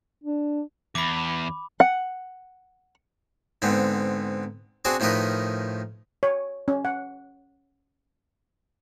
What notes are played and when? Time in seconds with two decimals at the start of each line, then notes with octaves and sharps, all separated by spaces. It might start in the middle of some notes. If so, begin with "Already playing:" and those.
0.24 D4
0.95 E2 B5 D6
1.80 F#5
3.62 G#2 D3 B3 C4
4.85 C4 D4 F#4 G#4 C5
5.00 A2 D#3 F3 A#4 B4 D#5
6.23 C#5
6.68 C#4
6.85 F#5